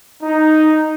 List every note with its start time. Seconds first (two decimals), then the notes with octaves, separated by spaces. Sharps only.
0.23 D#4